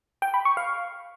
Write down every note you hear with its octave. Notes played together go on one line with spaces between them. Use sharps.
G5
B5
C#6
F5